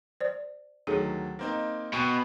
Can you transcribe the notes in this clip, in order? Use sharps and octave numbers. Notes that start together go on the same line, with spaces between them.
C5 D5
D2 D#3 F#3 G#4 A4
A#3 C4 D#4
B2 G5 G#5 C#6